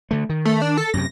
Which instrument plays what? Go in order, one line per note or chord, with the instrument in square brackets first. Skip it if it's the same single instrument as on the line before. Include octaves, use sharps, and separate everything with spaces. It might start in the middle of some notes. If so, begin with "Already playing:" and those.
[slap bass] D3 A3
D#3
[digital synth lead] A3
D4
A4
[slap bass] F#2 C3 [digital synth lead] A#6